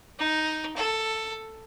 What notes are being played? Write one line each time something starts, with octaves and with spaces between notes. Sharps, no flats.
D#4
A4